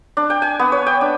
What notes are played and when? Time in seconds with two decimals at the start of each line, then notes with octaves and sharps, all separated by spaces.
0.17 D4
0.30 G5
0.42 G#5
0.59 B3
0.72 C#5
0.87 G5
1.01 D4